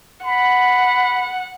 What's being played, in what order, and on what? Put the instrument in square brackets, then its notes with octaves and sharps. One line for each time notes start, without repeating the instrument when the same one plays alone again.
[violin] F#5 [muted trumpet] B5